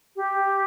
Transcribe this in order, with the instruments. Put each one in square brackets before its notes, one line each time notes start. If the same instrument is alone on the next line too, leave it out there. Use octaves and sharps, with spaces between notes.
[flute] G4